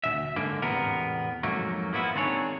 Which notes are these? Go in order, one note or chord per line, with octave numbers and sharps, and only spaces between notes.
D2 C#3 E5
G#2 D3 A#3
E2 A2 C3 B3 A#4
F2 G#2 F#3 A3 A#3
F3 A#3 B3 E4
D#3 C4 D4 G#4 C#5